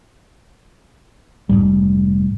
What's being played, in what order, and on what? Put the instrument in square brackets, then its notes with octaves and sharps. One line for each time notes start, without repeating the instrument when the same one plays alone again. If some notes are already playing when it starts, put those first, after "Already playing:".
[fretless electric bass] F1 C#2 G#2 G3